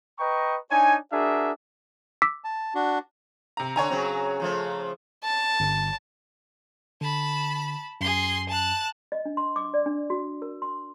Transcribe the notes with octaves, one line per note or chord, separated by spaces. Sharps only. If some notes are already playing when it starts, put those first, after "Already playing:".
B4 D#5 G5 A#5 C#6
D4 D#4 C#5 G#5
D4 F#4 G#4 A#4 E5
D6 E6 B6
A5
D4 F#4
C3 A#5
D3 D4 C#5 G#5 A#5
C#3 F#3 C4
C#3 F3 A3
A5
G1
D3 A5 B5
F#2 G#4 C6
A5 F#6
D#5
D4
C6
D6
D5
D4
F#4
A#4
C6